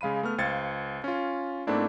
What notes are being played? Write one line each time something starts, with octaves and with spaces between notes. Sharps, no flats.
C#3 G#3 F5 B5 D#7
A3 B3 F6
C#2 C5 F5 G#6 A6 C#7
C#4 F4
G#2 A3 A#3 C4 D4 E4